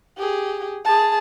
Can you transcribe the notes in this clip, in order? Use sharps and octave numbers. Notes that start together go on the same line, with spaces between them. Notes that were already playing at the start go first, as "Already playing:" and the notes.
G4 G#4
G#4 A5